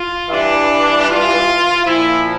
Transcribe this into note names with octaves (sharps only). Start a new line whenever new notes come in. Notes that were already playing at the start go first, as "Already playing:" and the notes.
Already playing: F4
G2 E3 D4
F4
A#2 F3 E4